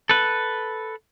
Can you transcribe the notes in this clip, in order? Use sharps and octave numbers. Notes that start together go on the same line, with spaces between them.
A4 B4